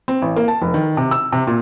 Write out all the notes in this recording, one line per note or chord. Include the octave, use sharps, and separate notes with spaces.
C4
A1
A#3
A5
F1
D#3
C3
E6
C3
A#2